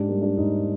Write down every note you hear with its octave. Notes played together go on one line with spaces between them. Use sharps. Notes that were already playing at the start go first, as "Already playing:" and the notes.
Already playing: G#2 D4 G4
G3 A#3
D4
G#2 D#4